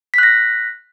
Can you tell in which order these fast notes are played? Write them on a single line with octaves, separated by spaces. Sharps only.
B6 F#6 A#6